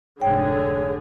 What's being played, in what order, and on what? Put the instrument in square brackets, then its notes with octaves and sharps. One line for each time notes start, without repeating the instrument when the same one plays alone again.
[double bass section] F1 G#2 [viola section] D3 G#4 [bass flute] C#5 [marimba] G5